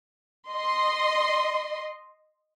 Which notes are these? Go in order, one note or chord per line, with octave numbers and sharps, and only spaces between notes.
D#5 C6